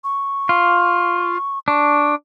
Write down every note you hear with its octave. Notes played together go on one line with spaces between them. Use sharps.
C#6
F4
D4 C#6